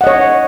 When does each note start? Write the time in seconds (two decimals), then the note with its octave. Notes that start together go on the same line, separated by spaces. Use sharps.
0.01 F#5
0.04 D#5
0.07 C#5